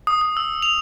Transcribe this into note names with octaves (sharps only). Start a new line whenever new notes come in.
D#6
D#6
E6
F7